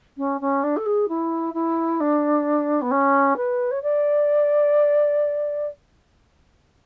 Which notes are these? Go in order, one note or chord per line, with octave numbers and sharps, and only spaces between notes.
C#4
C#4
D4
A4
G#4
E4
E4
D4
B3
C#4
B4
C#5
D5